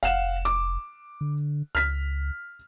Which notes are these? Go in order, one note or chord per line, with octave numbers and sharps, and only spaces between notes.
F1 F5 F#5 E7
D6
D3
C#2 F6 B6